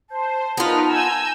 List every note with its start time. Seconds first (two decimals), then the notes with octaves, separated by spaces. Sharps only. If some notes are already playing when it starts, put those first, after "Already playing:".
0.10 C5 A5
0.57 B3 D#4 F4 A#4 B4
0.91 G#5 A#5 E6 G6